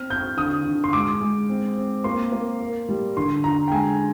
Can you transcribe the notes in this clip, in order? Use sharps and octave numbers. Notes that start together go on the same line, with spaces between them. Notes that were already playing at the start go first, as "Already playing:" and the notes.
Already playing: C4 F6
C4 G6
D3 D#6
D3
C6
G#3 D6
G#3
C4
C4
A#3 C6
A#3
A#4
G3
D3 C6
D3 A#5
G5
G#3 G#5